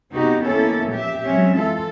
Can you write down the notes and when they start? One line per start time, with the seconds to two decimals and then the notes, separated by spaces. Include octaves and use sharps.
0.13 C3 B3 D#4 F#4 G4
0.42 D#3 A#3 B3 C#4 E4 A4
0.89 A#2 F3 G4 E5
1.25 F#3 G#3 C4 C#4 E5
1.56 E3 F4 A4